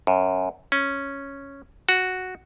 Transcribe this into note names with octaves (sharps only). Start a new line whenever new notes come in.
F#2
C#4
F#4